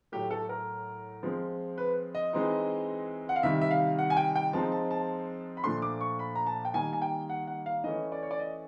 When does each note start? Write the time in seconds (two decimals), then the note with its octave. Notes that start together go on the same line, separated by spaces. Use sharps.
0.12 A2 F#3 A3 G4
0.31 A4
0.49 A#4
1.23 F3 G#3 C4
1.78 B4
2.15 D#5
2.33 E3 G#3 C4 D#4
3.29 F#5
3.36 F5
3.43 C3 D#3 G3 E5
3.61 E5
3.71 F5
3.99 F#5
4.10 G#5
4.17 G5
4.36 G5
4.53 F3 G#3 C4 D#4 A5
4.72 A5
4.91 A5
5.57 B5
5.64 A#2 F3 A3 D4 C6
5.82 D6
6.01 C#6
6.19 B5
6.36 A#5
6.47 A5
6.65 G5
6.74 D#3 G3 A#3 G#5
6.93 G#5
7.02 G5
7.30 F#5
7.48 F#5
7.66 F5
7.84 E3 A3 C#4 D#5
8.12 D5
8.23 C#5
8.31 D5
8.39 D#5